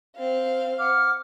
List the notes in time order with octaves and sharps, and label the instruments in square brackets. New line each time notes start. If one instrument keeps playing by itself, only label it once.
[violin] C4 F5
[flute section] F#5 D6 F6